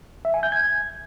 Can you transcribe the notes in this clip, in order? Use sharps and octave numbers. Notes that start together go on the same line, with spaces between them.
E5
G#5
G6
G#6